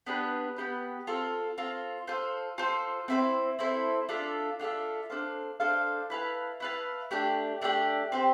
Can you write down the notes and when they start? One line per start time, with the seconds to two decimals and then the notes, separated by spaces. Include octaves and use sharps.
0.07 B3 D4 G4 B4
0.56 B3 D4 G4 B4
1.07 C4 F4 A4
1.58 C4 F4 A4
2.07 F4 A4 C5
2.58 F4 A4 C5
3.08 C4 E4 A4 C5
3.59 C4 E4 A4 C5
4.09 D4 F4 A4 E5
4.60 D4 F4 A4 E5
5.10 D4 A4 C5 F5
5.60 D4 A4 C5 F5
6.10 E4 B4 F5 A5
6.60 E4 B4 F5 A5
7.11 A3 D4 G4 D5
7.61 A3 D4 G4 D5
8.12 C4 G4 C5